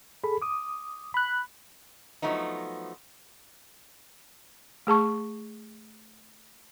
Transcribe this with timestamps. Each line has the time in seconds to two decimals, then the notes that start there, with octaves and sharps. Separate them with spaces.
0.24 G#4 A4 B5
0.42 D6 D#6
1.14 B5 F#6
2.22 F3 F#3 A3 B3 D#4
4.87 A3 G#4 A5 C#6